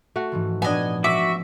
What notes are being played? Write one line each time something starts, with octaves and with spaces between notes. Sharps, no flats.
A3 F#4
G#2 E3 F3
A#2 B3 C#4 D4 D#5 G#5
G#3 F#4 E5 D6